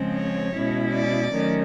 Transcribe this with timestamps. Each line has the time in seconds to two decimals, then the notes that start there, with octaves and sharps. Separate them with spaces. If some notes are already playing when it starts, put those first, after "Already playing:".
Already playing: C#3 F3 G#3 C4
0.15 C#5
0.54 B2 G#3 C#4 E4
0.92 D5
1.32 D#3 F#3 A3 C#4